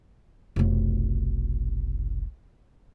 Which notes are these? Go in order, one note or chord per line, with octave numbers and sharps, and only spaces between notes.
F1 B1